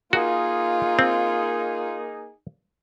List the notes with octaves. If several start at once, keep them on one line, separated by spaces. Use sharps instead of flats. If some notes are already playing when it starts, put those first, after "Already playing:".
A#3 D#4 F4 F#4 G#4
C4